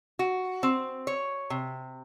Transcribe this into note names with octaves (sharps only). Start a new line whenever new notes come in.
F#4
C4
C#5
C3